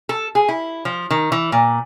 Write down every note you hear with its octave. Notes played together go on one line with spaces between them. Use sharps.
A4
G#4
E4
F3
D#3
E3
A#2